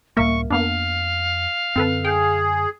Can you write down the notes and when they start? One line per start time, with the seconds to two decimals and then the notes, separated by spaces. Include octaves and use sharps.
0.17 C#2 A2 G3 A#3 A#4 E5 C#6
0.50 F2 A#3 B3 D4 F5
1.76 F#2 D3 C4 A4 B4
2.05 G#4 G5